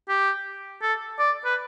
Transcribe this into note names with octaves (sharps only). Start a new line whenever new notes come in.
G4
A4
D5
B4